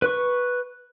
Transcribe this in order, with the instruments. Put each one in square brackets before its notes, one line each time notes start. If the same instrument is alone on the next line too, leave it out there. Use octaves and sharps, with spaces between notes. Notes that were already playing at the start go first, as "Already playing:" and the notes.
[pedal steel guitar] B4 C#6